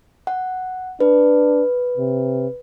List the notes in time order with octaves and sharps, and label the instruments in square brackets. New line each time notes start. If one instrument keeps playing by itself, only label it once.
[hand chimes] F#5
[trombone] D4 [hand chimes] B4
[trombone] C3